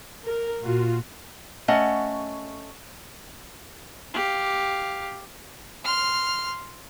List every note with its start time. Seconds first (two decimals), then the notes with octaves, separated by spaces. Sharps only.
0.25 A#4
0.62 A#2 F4 F#4
1.68 A3 C#4 D#5 F#5
4.13 G4 F5
5.85 C6 F6